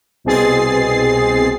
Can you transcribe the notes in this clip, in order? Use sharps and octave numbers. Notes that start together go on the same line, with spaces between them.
C2 B2 C4 G#4 A6 C7